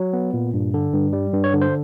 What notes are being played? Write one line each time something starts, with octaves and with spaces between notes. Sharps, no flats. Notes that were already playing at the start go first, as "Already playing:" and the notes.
Already playing: F#3
B3
A#2
G2
D3
G2
G3
G2
C#5
D3
C5